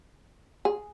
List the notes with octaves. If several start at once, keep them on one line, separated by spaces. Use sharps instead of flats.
G#4